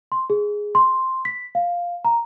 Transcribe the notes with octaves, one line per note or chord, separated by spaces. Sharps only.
C6
G#4
C6
B6
F5
A#5